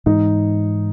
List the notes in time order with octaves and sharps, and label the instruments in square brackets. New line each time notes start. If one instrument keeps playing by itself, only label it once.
[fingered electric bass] G#2 E3 G#3 [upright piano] D#4